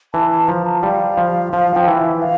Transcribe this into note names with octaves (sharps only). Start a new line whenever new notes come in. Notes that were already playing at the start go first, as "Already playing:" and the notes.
E3 A5
A5
F3 A#5
A5
G3 F5
F3
F3 F5
F3 G5
E3
E5
F5